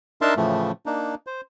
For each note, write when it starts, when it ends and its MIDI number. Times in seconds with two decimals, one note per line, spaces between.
0.22 0.34 62
0.22 0.34 63
0.22 0.34 70
0.22 0.34 76
0.22 0.34 81
0.22 0.34 84
0.37 0.71 45
0.37 0.71 49
0.37 0.71 52
0.37 0.71 53
0.37 0.71 57
0.86 1.15 58
0.86 1.15 62
0.86 1.15 63
1.27 1.41 72